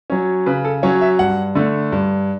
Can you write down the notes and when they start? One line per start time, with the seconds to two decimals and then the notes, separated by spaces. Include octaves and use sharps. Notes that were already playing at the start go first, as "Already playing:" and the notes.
0.10 F#3 C#4
0.46 C#3 B4
0.65 A4
0.83 F#3 C#4 C#5
1.01 E5
1.19 G2 F#5
1.55 D3 A3
1.92 G2